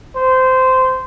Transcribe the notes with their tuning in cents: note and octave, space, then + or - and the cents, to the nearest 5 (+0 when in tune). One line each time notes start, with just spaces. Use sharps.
C5 -15